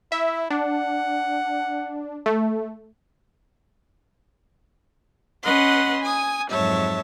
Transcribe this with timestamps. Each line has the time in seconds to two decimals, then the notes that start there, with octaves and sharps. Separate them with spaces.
0.12 E4 E5
0.50 D4 F#5
2.26 A3
5.43 C#4 B4 D#5 F#5 C6
6.03 G#5 D#6
6.50 F2 G#2 F#3 C#5 E5 A5